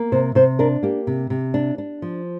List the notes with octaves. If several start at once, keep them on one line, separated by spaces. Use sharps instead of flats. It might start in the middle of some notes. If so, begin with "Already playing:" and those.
Already playing: A#3
C3 C5
C3 C5
D4 A#4
A#3 G4
C3
C3
D4
D4
F3